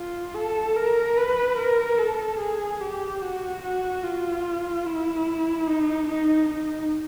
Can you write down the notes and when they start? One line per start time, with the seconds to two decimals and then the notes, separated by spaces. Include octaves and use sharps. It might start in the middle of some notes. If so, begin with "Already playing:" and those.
Already playing: F4
0.35 A4
0.76 A#4
1.17 B4
1.58 A#4
1.98 A4
2.40 G#4
2.81 G4
3.22 F#4
3.63 F#4
4.03 F4
4.86 E4
5.67 D#4
6.08 D#4
6.49 D#4